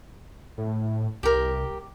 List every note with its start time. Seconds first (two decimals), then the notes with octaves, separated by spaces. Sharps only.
0.58 A2
1.23 C2 G4 A#4